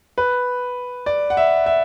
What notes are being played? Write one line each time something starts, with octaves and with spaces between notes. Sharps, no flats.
B4
D5
F#5
E5
E5